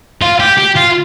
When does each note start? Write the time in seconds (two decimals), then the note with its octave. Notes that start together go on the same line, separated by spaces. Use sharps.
0.22 F4
0.40 G4
0.58 G4
0.76 F4